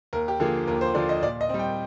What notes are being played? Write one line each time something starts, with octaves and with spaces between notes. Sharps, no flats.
D#2 A#4
G4
D3 F3 A#3 F4 G#4
D#2 A#4
C5
D3 F3 A#3 F4 D5
D#5
A#2 D5
D#5
G3 C4
G5